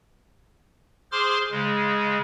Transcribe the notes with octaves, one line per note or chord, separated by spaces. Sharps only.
G#4 C5 C6 D6 F6
C#3 G#3